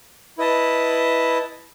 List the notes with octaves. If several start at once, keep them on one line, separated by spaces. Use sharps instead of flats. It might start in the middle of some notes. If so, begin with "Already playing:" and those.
E4 B4 D#5 A5